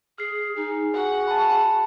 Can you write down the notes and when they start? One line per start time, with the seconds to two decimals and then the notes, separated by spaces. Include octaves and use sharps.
0.18 G#4 F6 C7
0.56 D#4 G#4
0.94 F#4 F#5
1.28 A5 B5